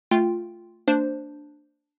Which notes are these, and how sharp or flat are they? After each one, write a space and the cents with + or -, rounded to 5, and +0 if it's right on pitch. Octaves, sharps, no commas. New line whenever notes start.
A3 +0 F4 -5 G5 +0
A#3 -45 D4 +0 C5 +0